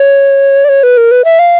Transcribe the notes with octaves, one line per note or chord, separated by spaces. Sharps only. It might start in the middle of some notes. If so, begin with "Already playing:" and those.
Already playing: C#5
D5
C#5
B4
A#4
B4
E5
F5